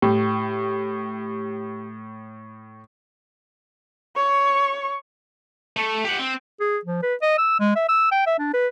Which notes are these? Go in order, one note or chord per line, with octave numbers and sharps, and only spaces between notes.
A2 G4
C#5 C#6
A3
G4 F#5
C4
G#4
F3
B4
D#5
E6
G#3
E5
E6
G5
E5
D4
B4